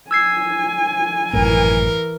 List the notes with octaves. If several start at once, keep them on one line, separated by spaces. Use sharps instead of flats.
G#5 E6 G#6 C7
G#1 F#2 A2 E3 A#4